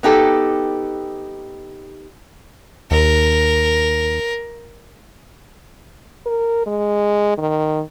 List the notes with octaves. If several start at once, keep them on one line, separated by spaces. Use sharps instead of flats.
B3 D#4 G4 A4
D#2 A#4
A#4
G#3
D#3